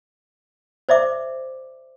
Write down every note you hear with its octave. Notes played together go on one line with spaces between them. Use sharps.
C5 D5 E5 D6